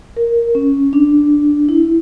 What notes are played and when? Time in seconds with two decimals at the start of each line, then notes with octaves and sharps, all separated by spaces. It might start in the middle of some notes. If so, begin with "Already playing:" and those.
0.16 A#4
0.55 C#4
0.93 D4
1.69 E4